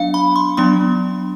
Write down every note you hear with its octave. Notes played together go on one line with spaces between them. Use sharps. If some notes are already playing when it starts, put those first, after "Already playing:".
Already playing: F#3 B3 D4 F5
B5
C6
F#3 B3 D4 C6